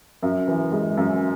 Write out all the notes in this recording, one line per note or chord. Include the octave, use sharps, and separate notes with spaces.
F#2
E3
G#3
F#2